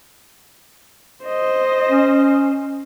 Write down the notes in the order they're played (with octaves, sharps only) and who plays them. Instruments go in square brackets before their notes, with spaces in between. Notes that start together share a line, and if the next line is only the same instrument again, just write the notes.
[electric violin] C5 D#5
[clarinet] C#4